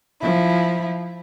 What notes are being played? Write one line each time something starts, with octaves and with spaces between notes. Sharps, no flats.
F3 E4